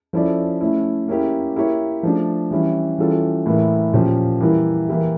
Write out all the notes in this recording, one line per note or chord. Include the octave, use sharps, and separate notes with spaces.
F3 C#4 E4 A4 D5
A3 C#4 E4
A#3 C#4 E4 G4 C#5
A#3 E4 G4 C#5
F3 A3 D4
E3 G3 C#4 E4
E3 G3 C#4 F4 A4
A2 E3 A#3 E4
A#2 F3 C#4 G4
E3 G3 A#3 E4
E3 A#3 E4 G4